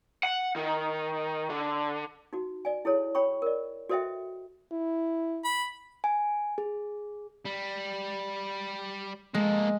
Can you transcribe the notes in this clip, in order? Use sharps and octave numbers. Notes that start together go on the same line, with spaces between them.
F#5
D#3
D3
D#4 F#4
D5 G#5
E4 G#4 A4 C#5
C#5 G5 B5 C#6
A#4 D5
F#4 A4 C5 D#5 E5 G5
E4
B5
G#5
G#4
G3
G#3 A#3 A4